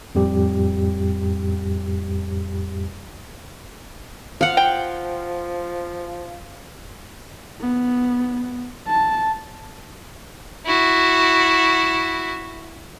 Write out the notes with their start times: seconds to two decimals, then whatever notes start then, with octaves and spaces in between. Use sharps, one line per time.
0.15 F2 A2 G3 G4
4.41 F3 F5 F#5
4.57 G5
7.60 B3
8.87 A5
10.66 E4 F#4